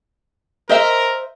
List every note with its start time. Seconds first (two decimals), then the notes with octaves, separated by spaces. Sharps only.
0.69 A#4 C5 D#5 E5